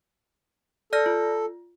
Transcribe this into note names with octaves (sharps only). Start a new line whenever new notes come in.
A4 D5 F6 A#6
F4